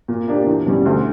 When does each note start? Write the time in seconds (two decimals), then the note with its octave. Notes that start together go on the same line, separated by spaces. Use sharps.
0.08 A#2
0.28 A#3 D4 G4
0.47 E2
0.66 B2 G3 C#4
0.86 D2